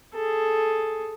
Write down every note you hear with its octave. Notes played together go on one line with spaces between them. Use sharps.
G#4 A4